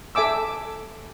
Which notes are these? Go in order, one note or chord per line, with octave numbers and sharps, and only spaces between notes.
A4 E5 G#5 D6 E6